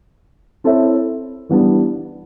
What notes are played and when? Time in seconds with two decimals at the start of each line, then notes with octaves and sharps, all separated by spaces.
0.64 C4 E4 A4 C#5 E5
1.49 E3 G3 B3 D4